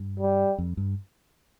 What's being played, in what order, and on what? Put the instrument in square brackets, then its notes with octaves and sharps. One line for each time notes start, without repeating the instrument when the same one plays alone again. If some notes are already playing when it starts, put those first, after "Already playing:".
Already playing: [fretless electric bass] G2
[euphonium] G3
[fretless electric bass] F2
G2